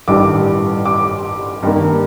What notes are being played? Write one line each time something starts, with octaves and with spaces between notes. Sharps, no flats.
A1 G2 D#3 G3 D6
D6
G2 D#3 A#3